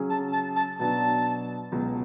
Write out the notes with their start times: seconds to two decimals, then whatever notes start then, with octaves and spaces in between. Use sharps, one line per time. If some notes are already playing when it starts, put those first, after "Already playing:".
Already playing: C#3 F#3 C#4 G#4
0.10 A5
0.33 A5
0.56 A5
0.79 B2 F#3 B3 D4 A5
1.72 C#2 B2 F#3